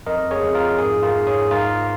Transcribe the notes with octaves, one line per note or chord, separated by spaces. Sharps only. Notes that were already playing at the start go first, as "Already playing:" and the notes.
F2 A#4 D#5
G#4 C#5
F2
F4 A#4
G#2 G#4
F4 A#4
G#2
G#4 C#5
G#2 F4 A#4